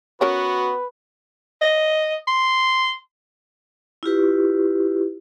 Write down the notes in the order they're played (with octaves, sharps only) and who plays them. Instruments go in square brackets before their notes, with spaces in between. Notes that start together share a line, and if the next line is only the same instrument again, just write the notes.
[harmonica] B3 [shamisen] C#4 A#4 C#5 [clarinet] F#4 [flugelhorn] B4
[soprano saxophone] D#5
C6
[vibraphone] E4 F4 G4 B4